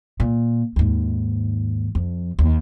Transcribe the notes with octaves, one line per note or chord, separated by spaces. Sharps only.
A#2
D#2 G#2
F2
D#2